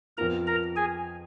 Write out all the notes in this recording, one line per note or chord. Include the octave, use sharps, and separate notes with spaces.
F2 F3 B3 F4 A#4 A#5
A#4 A#5
G#4 G#5